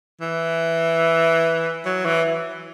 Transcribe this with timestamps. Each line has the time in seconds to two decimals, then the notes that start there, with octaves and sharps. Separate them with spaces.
0.21 E3
1.85 F#3
2.05 E3